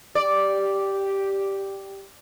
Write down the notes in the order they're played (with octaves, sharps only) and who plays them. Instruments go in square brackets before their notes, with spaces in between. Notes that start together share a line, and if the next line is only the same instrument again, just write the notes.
[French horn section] G4 [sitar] D5